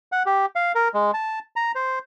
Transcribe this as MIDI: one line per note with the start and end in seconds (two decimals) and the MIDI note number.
0.12 0.23 78
0.26 0.46 67
0.56 0.72 77
0.75 0.88 70
0.94 1.11 56
1.14 1.39 81
1.56 1.72 82
1.75 1.99 72